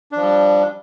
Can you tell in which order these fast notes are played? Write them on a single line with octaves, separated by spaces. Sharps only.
D4 F3 G3